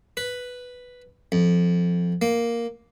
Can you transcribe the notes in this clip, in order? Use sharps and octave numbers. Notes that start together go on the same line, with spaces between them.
B4
F2
A#3